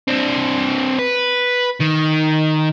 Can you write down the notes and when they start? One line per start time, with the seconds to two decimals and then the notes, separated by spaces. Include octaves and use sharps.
0.08 C4 D4
0.99 B4
1.81 D#3